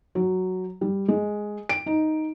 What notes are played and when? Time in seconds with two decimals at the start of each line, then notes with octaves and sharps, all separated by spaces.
0.15 F#3
0.81 G3
1.08 G#3
1.69 D7
1.86 D#4